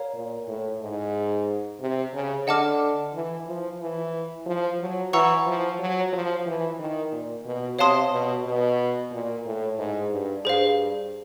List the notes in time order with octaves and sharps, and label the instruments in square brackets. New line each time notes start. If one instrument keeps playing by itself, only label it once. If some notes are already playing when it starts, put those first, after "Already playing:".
Already playing: [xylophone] A#4 C#5 F5 A#5
[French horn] A#2
A2
G#2
C3
C#3
[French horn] D3 [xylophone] D#5 F#5 A5 D6 F6
[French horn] E3
F3
E3
F3
F#3
[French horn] E3 [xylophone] F#5 A#5 C#6 E6
[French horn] F3
F#3
F3
E3
D#3
A#2
B2
[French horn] C3 [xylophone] C#5 F5 A5 C6 D#6
[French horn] B2
B2
A#2
A2
G#2
G2
[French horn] G2 [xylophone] G#4 C5 F5